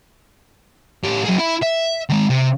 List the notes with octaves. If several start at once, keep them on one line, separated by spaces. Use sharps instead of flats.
A2 G4
F#3 G#4
E4
E5
D#3 G#3
C3